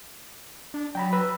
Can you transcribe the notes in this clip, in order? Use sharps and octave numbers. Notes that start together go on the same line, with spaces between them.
D4
F#3 G5 A#5 B5
B4 E6